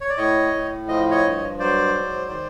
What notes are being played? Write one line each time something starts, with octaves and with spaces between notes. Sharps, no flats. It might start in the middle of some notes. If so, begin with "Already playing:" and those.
C#5
D5
A2 C#5 D#5
A2
F3 D#5
C#5 D#5
G2
F#3 C5 D5
G#2
D#3